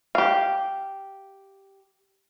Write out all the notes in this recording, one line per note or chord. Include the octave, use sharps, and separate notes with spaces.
G4 F5